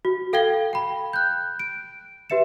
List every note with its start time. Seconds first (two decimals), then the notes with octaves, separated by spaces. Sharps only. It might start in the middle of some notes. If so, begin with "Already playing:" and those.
0.05 F#4
0.33 A4 F5 G5 G#6 A#6 G7
0.73 G5 B5
1.13 F#6 G6
1.59 D7
2.30 G4 B4 E5 C#7 E7